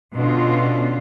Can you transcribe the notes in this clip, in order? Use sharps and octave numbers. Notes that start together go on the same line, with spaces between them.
B2 D3 C#4 F4